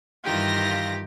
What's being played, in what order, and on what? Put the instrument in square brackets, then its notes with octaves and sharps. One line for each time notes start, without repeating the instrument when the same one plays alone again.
[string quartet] G2 D#3 E3 [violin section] F4 A#6 [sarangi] G4